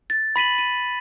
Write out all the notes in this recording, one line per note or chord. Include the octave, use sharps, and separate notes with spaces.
A6
B5 B6 D#7 F#7
D#7